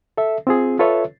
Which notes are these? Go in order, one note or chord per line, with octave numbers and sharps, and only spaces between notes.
A4 E5
C4 F4 G#4
F4 A4 B4 C#5 E5